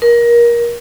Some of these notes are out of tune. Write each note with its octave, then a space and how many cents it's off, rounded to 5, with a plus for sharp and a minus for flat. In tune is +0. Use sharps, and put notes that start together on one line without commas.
A#4 +20